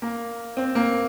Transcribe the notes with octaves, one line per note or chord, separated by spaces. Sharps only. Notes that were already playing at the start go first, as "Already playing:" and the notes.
A#3
C4
A#3